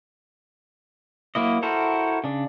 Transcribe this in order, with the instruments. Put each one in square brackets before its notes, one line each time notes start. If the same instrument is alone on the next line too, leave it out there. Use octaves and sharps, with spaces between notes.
[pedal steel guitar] F#3 A#3 E4 D#5
E4 F#4 A4 A#4 C5
C#3 D4